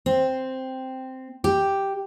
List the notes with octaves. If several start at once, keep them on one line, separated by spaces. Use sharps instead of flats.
C4
G4